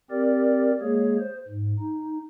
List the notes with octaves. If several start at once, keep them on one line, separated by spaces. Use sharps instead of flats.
C4 G4 A#4 D5
G#3 A#3 G#4 C#5
C5
G#2
D#4